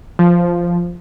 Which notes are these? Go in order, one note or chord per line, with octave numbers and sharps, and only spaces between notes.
F3